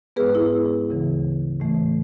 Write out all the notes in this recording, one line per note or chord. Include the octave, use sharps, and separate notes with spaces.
G#2 G#3 B3 G#4 B4
E4 G#4
D2 C#3 E3
A2 E3 A3